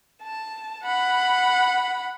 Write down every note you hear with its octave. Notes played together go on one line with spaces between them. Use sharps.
A5
F#5 B5